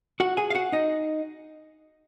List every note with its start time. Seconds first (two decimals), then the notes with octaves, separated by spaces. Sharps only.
0.20 F#4 F#5
0.37 G#4 G#5
0.50 F5
0.55 F#4 F#5
0.72 D#4 D#5